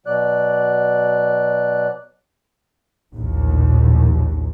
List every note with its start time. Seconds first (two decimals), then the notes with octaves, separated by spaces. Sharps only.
0.06 B2 F#3 D5 F#6
3.14 A#1 D#2 A2